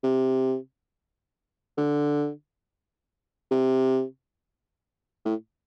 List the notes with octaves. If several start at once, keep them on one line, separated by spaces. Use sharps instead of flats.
C3
D3
C3
A2